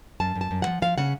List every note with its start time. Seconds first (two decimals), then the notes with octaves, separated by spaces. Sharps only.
0.20 F#2 A5
0.35 F#2
0.41 A5
0.51 F#2
0.62 F3 F#5
0.82 F3 F5
0.98 C#3 F#5